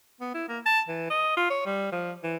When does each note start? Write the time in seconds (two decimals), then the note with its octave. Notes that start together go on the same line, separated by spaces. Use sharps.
0.21 B3
0.34 E4
0.49 A#3
0.66 A5
0.88 E3
1.10 D#5
1.37 F4
1.50 C#5
1.66 G3
1.92 F3
2.24 E3